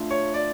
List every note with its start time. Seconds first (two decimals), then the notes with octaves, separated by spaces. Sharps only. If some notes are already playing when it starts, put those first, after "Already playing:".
Already playing: A3 D4 F4
0.11 C#5
0.34 D5